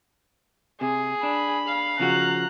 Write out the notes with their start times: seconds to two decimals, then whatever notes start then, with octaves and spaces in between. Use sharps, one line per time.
0.81 C3 G#4
1.23 D4 B5
1.68 F5
2.00 C#3 F3 F#4 A#5 F#6